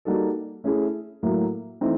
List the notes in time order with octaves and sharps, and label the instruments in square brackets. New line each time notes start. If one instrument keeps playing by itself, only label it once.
[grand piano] G3 A#3 D#4 F#4 A4
A3 C#4 E4 G#4
A2 F#3 A#3
E3 A3 C4 D#4